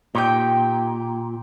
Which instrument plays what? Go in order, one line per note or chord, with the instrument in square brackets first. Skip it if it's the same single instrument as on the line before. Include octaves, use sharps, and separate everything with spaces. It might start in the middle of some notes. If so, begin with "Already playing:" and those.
[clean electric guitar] A#2 [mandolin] D#4 G4 G5